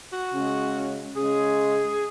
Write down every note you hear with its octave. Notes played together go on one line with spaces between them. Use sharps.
F#4
C#3 G#3 C#4
C#3 G#3 C#4 G#4